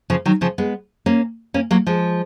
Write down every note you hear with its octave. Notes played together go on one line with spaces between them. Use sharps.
C#3 F3
D#3 F#3
C#3 F3
G#3 B3
A#3 C#4
A#3 C#4
F#3 A#3
F3 G#3